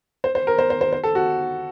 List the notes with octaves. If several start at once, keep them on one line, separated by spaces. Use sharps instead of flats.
C5
C5
A#4
C5
C5
C5
C5
A4
F#4